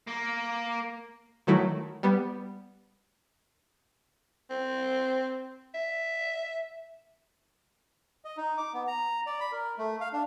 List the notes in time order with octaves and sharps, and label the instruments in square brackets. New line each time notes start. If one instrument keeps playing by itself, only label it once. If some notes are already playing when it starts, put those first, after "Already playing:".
[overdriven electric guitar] A#3
[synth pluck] D#3 E3 F#3 A3 E4
G3 B3
[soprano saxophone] C4
E5
[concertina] D#5
D#4
D6
B3
A#5
D5
B5
A#4
A3
F5
D4